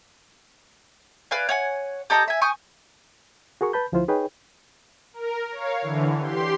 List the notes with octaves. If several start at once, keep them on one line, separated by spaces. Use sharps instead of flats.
B4 D5 F5 G#5
C#5 F#5 G#5
G4 A4 D#5 A#5
E5 G#5
G#5 C#6 D#6 G6
F#4 G#4 A#4 C#6
B4 A5 B5 G6
D2 F3 E4 F4 C5
D#4 G#4 B4 C#5 G5
A#4
C#5 F5
D3 E3
G4 C6